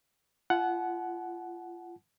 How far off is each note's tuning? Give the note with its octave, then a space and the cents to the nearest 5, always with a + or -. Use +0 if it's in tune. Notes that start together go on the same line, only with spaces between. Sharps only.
F4 -25 F#5 +5 A5 -45